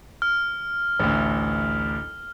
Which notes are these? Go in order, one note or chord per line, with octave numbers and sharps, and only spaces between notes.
F6
A1 D2